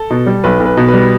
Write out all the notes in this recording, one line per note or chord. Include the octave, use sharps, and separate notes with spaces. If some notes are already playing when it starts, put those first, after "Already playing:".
Already playing: A4
B2
G3
B1 B4
B1
B4
B2
B4
G3